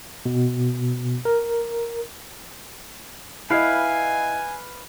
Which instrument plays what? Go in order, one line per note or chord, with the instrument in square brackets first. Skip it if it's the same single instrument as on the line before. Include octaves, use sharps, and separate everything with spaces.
[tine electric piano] B2
A#4
[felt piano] E4 D#5 [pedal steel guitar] B4 F5 [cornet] G#5